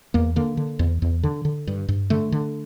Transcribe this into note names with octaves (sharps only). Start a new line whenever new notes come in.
E2 A#3
D3 A#3
D3
E2
E2
D3
D3
G2
G2
D3 A3
D3